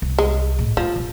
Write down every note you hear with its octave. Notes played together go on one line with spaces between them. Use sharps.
C2
G#3
G#1 A2
F3 F4
D1 A#1